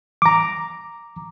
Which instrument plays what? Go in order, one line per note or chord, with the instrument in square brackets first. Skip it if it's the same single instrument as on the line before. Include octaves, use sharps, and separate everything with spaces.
[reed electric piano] A#5 D6